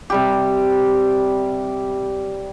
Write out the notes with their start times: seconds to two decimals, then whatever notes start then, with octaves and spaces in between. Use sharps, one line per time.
0.10 C3 G3 G4